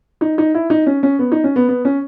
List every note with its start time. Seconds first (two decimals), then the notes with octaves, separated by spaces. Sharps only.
0.21 D#4
0.38 D#4
0.54 E4
0.70 D#4
0.87 C#4
1.03 C#4
1.19 B3
1.32 D#4
1.44 C#4
1.56 B3
1.69 B3
1.85 C#4